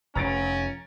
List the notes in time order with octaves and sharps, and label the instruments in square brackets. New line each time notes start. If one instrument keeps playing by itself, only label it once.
[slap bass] F1 [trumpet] C#4 [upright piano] A#5 A6 D7